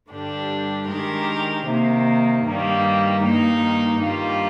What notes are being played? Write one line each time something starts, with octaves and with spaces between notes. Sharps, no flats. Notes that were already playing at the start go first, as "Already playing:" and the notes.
G2 D3 G3 D4 G4
D#3 G#3 D4 G4 A#4
C3 D#3 A#3
G2 D#3 G3 A#3
G2 D#3 A#3 D#4
G2 D#3 G3 A#3 F4